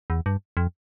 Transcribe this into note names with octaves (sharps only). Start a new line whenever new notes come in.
E2
G2
F2